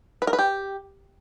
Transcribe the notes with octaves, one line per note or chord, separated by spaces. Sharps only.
B4
A#4
B4
G4